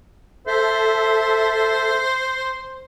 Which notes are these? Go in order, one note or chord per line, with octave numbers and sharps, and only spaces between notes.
A4 C5 E5